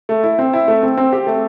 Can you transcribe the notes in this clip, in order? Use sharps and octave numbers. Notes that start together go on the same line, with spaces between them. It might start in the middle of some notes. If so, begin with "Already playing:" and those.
A3
E4
C4
E4
A3
C4
C4
G4
A3